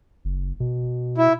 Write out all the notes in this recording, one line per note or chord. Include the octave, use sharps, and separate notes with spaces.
F#1
B2
E4